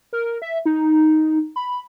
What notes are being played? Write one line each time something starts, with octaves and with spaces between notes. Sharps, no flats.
A#4
E5
D#4
B5